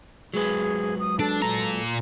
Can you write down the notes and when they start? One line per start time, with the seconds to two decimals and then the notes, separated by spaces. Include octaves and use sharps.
0.34 F#3 G#3 G#4 B4
0.99 D#6
1.19 D4 A4
1.42 A#2 A#5